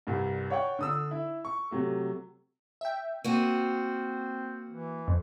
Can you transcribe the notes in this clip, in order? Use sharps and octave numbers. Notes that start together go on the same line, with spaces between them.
C2 G2
C#5 D5 F#5 G5 C#6
D3 D#6 E6
E4
C#6
C3 F#3 A3
E5 G5
A#3 C4 F#4 D#7
E3
F2